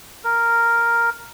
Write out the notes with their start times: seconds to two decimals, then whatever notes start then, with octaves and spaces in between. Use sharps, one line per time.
0.24 A#4